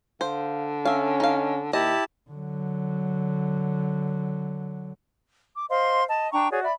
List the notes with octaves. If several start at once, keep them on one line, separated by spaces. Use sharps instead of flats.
D3 C5 F5
C#4 E5 F5
D#4 F5
D#2 E4 G4 D#5 A5
D3 F#3
D6
C5 D#5 F5 C6
D#5 A5
D4 G5 A#5 C#6
F#4 G#4 C#5 D5
D5 E5 B5